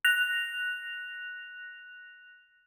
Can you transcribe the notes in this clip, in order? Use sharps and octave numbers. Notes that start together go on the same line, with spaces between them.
F#6 A#6 F7